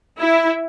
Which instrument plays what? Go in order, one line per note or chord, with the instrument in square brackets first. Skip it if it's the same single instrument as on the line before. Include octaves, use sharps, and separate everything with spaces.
[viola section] E4